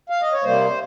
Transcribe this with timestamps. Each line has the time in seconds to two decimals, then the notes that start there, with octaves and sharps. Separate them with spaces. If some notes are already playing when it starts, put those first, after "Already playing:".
0.10 F5
0.22 D#5
0.32 C#5
0.44 C3 G3 A#3 C5